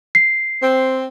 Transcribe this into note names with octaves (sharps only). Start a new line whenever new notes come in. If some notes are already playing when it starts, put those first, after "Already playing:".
C7
C4